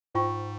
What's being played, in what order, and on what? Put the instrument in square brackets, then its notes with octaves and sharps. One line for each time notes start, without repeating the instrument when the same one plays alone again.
[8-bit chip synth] G#2 [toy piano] F4 C5 G5 C#6